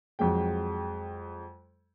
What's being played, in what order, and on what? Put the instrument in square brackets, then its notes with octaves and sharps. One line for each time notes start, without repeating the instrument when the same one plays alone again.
[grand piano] F2 F#3 G#3 G5